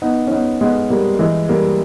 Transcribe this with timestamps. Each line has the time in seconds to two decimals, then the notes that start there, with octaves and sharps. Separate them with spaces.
0.02 B3 D#4
0.27 C#4
0.31 B3 D#4
0.61 G#3 B3
0.90 G3 A#3
1.19 E3 G#3
1.49 G3 A#3